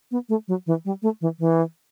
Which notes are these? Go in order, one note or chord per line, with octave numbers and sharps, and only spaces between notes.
B3
A3
F#3
E3
G3
A3
E3
E3